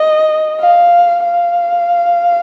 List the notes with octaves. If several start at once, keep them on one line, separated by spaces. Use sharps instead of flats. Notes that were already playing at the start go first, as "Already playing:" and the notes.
Already playing: D#5
F5
F5